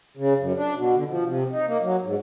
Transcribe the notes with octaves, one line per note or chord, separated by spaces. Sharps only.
C#3
F#2
D4
B2
D3
F3
C3
D#4
A#3
F#3
G#2